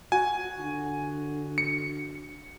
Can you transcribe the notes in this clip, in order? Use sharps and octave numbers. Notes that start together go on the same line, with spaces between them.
F#4 G#5
D3
C#7